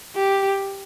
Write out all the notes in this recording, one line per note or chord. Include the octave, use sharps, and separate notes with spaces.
G4